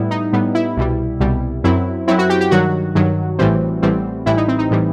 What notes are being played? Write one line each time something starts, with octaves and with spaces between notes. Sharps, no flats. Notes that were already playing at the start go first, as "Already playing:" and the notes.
Already playing: A2 G3 B3 E4
D#4
A2 G3 B3
E4
C2 B2 G3
C2 B2 G3
F#2 F#3 C4 E4
F#2 F#3 C4 E4
F#4
G4
G4
G2 D#3 F#3 F#4
G2 D#3 F#3
A1 A2 E3 G3 C4
A1 A2 E3 G3 C4
A1 A2 E3 G3 E4
D#4
C4
D#4
A2 E3 G3